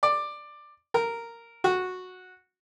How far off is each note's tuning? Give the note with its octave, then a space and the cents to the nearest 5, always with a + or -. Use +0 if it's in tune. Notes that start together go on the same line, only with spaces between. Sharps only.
D5 +10
A#4 -10
F#4 -10